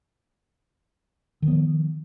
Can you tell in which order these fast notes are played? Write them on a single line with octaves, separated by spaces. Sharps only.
D#3 F3 B3